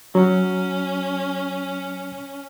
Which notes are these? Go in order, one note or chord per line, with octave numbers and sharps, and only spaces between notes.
F#3 C#4